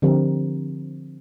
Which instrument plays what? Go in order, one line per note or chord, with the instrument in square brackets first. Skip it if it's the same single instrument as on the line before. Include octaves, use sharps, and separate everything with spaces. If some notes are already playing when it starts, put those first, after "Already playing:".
[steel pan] D3 F3 C4 G4 A#4